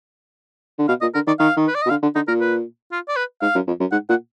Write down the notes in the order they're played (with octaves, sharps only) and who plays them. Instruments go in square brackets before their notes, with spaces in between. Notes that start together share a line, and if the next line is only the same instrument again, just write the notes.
[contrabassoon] D3
[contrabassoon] B2 [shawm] F5
[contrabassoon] A#2 [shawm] D#5
[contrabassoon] D3 [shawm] A#4
[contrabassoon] D#3 [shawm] D5
[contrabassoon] D#3 [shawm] F5
[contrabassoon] D#3
[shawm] B4
D5
D#5
[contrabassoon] B2
[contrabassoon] D3 [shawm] F5
[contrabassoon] D3
[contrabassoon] D3 [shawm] D#4
[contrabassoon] A#2 [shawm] A#4
[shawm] B4
F4
D5
B4
[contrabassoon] G#2 [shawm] F5
[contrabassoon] F#2
F2
F#2
[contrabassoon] G#2 [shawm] F#5
[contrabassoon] A#2 [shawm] F#5